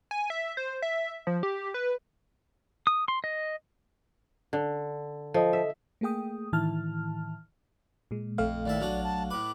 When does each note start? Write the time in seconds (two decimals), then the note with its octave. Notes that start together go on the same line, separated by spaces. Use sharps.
0.11 G#5
0.30 E5
0.57 C5
0.82 E5
1.27 F3
1.43 G4
1.74 B4
2.87 D#6
3.08 C6
3.24 D#5
4.53 D3
5.34 F3 A4 D#5
5.53 E5
6.01 A3 A#3 G#4 G5 D#6
6.53 A2 D#3 E3 E4 A5 F6
8.11 A#2 G#3
8.38 A#1 F2 A3 F5
8.66 D#2 A2 D5 E5
8.81 F#3 D4
9.04 A5
9.31 A2 B4 D6